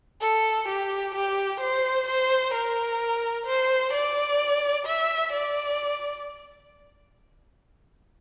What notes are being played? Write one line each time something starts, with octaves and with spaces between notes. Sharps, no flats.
A4
G4
G4
C5
C5
A#4
C5
D5
E5
D5